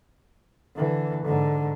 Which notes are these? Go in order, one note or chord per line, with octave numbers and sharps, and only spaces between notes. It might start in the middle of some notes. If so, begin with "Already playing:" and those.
D3 E3
G#2 D3